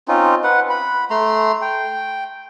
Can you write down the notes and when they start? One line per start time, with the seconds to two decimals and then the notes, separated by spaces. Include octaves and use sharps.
0.08 C4 C#4 D#4 F4
0.44 B4 F#5
0.70 B5
1.10 A3 A#5 C6
1.62 G5